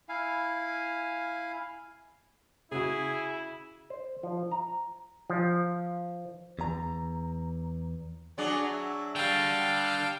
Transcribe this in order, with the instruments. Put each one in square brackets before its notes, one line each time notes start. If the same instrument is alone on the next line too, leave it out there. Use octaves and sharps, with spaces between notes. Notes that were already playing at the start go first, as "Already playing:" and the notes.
[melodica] E4 F5 G#5
[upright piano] C#3 F#4 [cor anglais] E4 [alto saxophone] G#4
[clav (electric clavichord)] C5
F3
A#5
F3
[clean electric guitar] E2 A#5
[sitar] F#3 D4 G#4 [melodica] D5
[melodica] E5
[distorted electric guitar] D3 [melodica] G3 A5 [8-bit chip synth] F5 G5